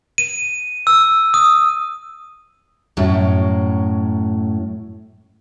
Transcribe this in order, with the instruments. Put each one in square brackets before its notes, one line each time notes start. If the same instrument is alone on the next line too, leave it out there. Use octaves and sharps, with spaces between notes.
[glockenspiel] D#7
E6
D#6
[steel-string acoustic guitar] F#2 A2 F#3